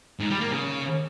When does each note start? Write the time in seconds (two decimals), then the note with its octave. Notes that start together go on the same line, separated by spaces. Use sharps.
0.20 G#2
0.30 G3
0.41 A#3
0.52 C#3